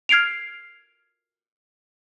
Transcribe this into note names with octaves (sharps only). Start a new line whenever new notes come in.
F6 G#6 C7 D7 F7